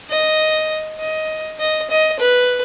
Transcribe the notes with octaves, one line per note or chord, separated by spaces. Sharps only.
D#5
D#5
D#5
D#5
B4